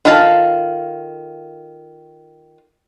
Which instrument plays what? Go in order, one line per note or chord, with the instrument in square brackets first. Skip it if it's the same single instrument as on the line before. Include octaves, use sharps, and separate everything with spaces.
[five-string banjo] D#3 F4 A4 F5 A5